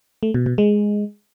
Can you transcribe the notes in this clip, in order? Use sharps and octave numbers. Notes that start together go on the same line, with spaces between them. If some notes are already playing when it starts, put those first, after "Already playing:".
A3
B2
B2
G#3